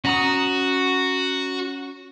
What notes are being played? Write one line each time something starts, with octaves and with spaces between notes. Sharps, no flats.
C#4 F#4 A#5 D#6